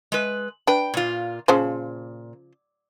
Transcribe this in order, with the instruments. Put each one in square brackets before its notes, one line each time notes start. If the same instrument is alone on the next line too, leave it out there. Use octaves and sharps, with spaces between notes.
[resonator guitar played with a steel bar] G#3 B4
[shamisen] D4 B4 [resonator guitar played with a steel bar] G5
[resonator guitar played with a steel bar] A#2 F4
[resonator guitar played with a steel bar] A#2 [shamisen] C#3 F3 C5